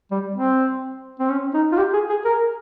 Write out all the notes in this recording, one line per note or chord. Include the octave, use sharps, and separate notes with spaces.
G3
C4
C4
C#4
D#4
F4
G4
G#4
G#4
A#4